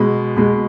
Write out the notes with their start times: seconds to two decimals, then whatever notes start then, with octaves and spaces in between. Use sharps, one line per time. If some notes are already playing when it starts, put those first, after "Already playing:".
Already playing: B2 G#3 B5
0.36 B2 G#3